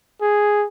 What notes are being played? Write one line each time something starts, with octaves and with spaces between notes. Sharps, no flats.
G#4